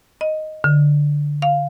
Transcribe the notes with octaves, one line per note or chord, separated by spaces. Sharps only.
D#5
D3
F5